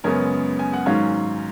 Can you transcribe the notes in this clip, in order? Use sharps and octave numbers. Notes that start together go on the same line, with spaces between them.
F#2 C#3 G#3 B3 A#4 C#5
G#5
F#5
G#2 D#3 F#3 C#4 C#5 F5